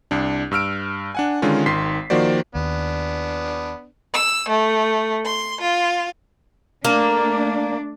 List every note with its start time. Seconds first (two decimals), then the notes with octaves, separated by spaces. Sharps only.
0.11 C2 D4
0.51 G2 E6 F6 D7
1.15 D4 F#5 G#5
1.42 D3 D#3 G#3 C#4 F4
1.66 G#1 D#3 C6 B6 C7
2.10 D#3 F3 A#3 F#4 C5 D5
2.55 D#2 B3 D4
4.14 E6
4.48 A3
5.25 C6
5.61 F4
6.85 A3 A#3 D4